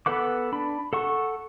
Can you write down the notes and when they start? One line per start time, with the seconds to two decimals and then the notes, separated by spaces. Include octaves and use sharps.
0.06 B3 A4 B4 F#5 D6
0.52 D4 B5
0.93 A4 F#5 C#6